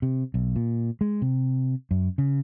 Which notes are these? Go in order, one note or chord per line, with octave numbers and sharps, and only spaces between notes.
C3
B1
A#2
G#3
C3
F#2
C#3